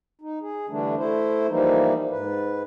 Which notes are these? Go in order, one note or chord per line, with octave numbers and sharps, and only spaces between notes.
D#4
G#4
D3 E3 G3 A3 D4
A3 E4 C5
E3 F3 G3 A#3 D#4
G#2 B4